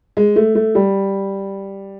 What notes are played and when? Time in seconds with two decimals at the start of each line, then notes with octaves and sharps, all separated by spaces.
0.17 G#3
0.36 A3
0.55 A3
0.75 G3